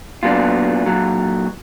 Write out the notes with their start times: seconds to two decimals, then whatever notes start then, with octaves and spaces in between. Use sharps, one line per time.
0.23 A#2 F#3 B3 D4 F4
0.86 A#2 F#3